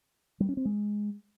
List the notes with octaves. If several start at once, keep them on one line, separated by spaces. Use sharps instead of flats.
G3
C#4
C4
G#3